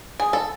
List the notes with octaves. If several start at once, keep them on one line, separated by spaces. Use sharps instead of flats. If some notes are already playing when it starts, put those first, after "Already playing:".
G#4
A4